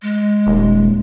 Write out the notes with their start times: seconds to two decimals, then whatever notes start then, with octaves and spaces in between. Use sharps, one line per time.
0.02 G#3
0.47 D#1